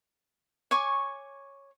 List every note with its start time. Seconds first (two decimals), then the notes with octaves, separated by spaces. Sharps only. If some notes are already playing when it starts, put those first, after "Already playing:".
0.71 C#5 G#5 C#6 D6